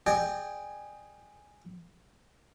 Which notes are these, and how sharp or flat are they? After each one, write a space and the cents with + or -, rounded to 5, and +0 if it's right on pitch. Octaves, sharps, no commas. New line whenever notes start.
G#4 +0 D5 +40 G5 +0